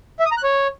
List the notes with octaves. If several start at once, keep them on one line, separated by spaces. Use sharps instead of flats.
E5
D#6
A#5
F#6
C#5